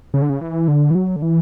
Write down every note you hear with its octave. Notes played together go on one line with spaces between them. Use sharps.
C#3
D3
C#3
E3
D3
E3
F#3
D3
E3